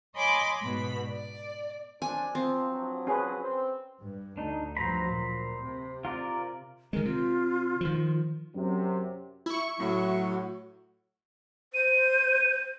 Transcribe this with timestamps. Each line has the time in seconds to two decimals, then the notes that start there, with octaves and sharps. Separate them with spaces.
0.14 C#5 D#5 G#5 B5 C6 D6
0.60 G#2 B2 B5
1.07 D5
2.02 F#3 C4 D4 G#5
2.35 F3 C4
2.70 G2 F3 F#3
3.07 C#4 G#4 B4
3.41 C4
4.00 G2
4.37 D2 D4 D#4
4.77 G2 F3 F#3 C5 A#5 B5
5.09 A#2
5.61 C3
6.05 F4 A#4 D5
6.93 D#3 G#3 A#4
7.05 C3 F4
7.81 D#3 F3
8.55 F#2 C3 F#3
9.46 E4 C#6
9.80 A2 F#3 F#4
11.73 C5 D#7